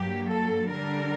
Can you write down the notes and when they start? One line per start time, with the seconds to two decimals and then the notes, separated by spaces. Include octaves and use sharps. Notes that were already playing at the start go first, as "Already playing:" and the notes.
Already playing: G2 F#3 A#3 G4
0.30 A4
0.71 D3 G3 D4 A#4